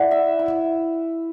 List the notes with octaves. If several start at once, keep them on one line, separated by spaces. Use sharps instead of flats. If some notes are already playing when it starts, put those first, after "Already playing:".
Already playing: E4 D5 F#5
E5
E4